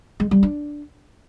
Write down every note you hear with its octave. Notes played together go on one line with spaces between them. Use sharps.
G#3
G3
D4